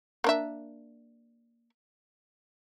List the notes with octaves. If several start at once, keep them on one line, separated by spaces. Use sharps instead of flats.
A#3 D4 E5